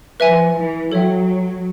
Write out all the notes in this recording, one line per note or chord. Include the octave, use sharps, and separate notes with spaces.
F3 B4 E5 G#5
E3
F#3 A4 C#5 E5 G5